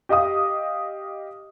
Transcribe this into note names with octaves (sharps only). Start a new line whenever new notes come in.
G4 D#5 F5 D#6